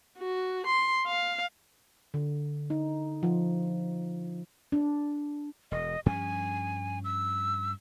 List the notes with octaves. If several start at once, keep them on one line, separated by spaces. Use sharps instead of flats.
F#4
C6
F5
D3
D#4
F3
D4
E1 D#5
G2 F3 C#4 G#5
E6